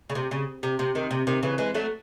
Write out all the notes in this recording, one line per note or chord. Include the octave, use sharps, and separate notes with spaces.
C#3
C3
C#3
C3
C3
C3 D#3
C3
C3 D#3
C#3 E3
E3 G#3
F#3 A3